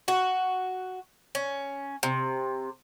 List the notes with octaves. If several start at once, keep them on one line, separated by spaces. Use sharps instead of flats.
F#4
C#4
C3